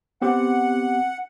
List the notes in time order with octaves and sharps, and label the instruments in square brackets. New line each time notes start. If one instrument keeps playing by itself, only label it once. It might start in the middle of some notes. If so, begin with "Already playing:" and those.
[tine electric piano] B3 C4 G4 [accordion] F#5